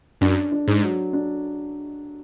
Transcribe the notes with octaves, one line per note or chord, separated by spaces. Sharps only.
F#2 D4
D4
G#2
F#3
D4